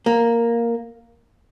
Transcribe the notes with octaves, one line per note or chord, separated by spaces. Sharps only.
A#3